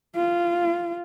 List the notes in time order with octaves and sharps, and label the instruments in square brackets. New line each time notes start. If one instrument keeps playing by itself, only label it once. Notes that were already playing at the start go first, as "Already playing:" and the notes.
[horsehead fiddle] F4